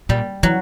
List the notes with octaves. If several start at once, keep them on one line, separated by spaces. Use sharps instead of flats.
A#2 G3
E3 F#3